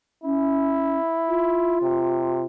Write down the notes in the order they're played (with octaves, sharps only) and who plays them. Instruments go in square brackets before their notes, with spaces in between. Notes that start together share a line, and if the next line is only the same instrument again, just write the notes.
[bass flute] C#4 [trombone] E4
[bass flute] F4
[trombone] C3